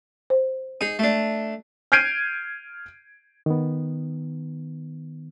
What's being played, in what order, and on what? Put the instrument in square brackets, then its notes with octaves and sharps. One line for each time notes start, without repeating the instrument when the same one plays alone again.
[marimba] C5
[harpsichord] D#4 G#4
A3 D4
[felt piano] F6 G6 G#6 C7 D7 D#7
[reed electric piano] D#3 B3